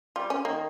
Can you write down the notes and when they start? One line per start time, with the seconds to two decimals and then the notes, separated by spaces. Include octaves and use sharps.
0.16 G3 F4
0.30 C#4
0.45 D#3 A#3